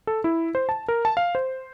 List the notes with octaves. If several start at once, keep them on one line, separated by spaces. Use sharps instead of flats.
A4
E4
C5
A5
A#4
A5
F5
C5